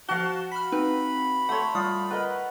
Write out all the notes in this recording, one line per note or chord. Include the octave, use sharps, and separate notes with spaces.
F3 F#4 F5 A5 F#6 G7
B5 F6 B6
C4 D#4 B4
A3 C#5 F#5 C6
G3 F4 D#6
A#4 B4 D#5 F#5